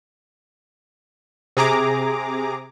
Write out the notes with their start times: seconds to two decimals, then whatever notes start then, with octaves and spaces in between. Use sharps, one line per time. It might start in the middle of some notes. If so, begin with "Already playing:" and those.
1.57 C3 G#4 A#5 D6